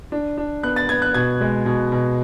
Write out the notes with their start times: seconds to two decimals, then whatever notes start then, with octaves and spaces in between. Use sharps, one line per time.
0.12 D4
0.38 D4
0.63 B3 F#6
0.76 A6
0.89 B3 G#6
1.02 F#6
1.14 B2 G#6
1.41 G#3
1.66 B2
1.92 B2